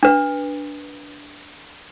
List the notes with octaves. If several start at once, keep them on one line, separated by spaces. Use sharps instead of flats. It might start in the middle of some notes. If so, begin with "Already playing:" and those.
D4 B4